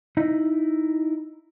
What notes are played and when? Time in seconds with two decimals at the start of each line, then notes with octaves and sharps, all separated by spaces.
0.17 D#4 E4 D#5